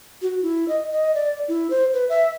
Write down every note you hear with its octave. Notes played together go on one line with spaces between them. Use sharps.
F#4
E4
D#5
D#5
D5
E4
C5
B4
E5